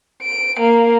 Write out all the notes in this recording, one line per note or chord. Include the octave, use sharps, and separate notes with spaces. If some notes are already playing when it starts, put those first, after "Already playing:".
D7
A#3